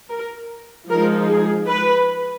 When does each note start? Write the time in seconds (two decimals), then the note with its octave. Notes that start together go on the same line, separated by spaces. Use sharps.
0.09 A#4
0.89 F3 G#3 D#4 A#4
1.29 G#4
1.69 B4